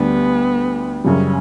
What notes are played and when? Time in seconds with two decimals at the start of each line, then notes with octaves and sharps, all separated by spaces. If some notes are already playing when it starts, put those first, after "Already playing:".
Already playing: D2 D3 G3 B3 D4 G4
1.04 F#2 C#3 G3 C#4